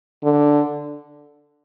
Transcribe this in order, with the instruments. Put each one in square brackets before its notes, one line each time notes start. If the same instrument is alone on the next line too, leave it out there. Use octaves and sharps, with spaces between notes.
[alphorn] D3